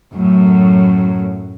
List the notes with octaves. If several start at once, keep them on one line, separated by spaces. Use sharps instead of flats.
F#2 A2